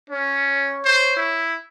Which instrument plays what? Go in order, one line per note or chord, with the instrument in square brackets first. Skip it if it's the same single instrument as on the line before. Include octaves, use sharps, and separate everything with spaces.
[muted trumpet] C#4 [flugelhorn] C#5
[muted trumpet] C5
E4